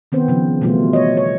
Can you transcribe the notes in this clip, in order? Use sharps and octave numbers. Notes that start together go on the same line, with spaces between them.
D#3 B3 C4 C5
C#3 F3
B2 E3 G3 A3 B3 F4
C#5 D#5
C#5